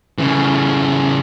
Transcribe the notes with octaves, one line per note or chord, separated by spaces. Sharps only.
C#3 E3